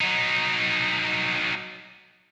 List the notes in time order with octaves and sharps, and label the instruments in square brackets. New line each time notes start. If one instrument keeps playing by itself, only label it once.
[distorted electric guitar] F#3 D#4